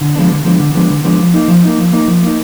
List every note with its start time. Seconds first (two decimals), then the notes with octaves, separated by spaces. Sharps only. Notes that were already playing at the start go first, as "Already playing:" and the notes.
0.01 D3
0.16 F3 G#3 B3 D4
0.31 D3
0.45 F3 G#3 B3 D4
0.59 D3
0.75 F3 G#3 B3 D4
0.90 D3
1.04 F3 G#3 B3 D4
1.19 F3
1.34 A#3 D#4
1.48 F3
1.63 A#3 D#4
1.78 F3
1.93 A#3 D#4
2.08 F3
2.23 A#3 D#4